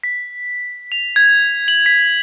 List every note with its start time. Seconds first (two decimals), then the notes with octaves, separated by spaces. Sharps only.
0.04 B6
0.92 F7
1.16 G#6
1.68 F#7
1.86 B6